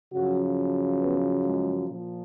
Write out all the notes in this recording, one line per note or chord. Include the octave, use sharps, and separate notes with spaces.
F#2 C#3 F3 F#3 F#4
B3 B4
G#3 G#4
A#2 F3